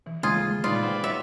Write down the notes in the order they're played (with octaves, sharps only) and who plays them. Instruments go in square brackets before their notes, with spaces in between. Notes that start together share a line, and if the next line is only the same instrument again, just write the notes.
[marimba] B2 E3
[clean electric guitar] D#2 G#3 A3 [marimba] C#3 A#5 [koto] F4 G#4
[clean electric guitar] A#2 D3 G#3 [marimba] D#4 [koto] F4 [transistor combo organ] B4 D5
[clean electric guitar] C5 F#5 G5
[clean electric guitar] F#4 C#5 [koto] E5